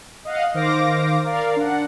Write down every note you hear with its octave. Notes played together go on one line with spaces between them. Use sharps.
D#5 F5 F#5
D#3 C5 F5 D6 A#6
A#4 D5 F5
D4 F#5